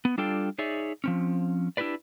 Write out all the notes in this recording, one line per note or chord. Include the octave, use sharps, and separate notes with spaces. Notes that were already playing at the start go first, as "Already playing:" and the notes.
B3
G3 D4 F4 A4 D5 G5
D#4 G#4 C#5 D5 E5
F3 C4 C#4
D4 E4 F#4 G4 B4 D5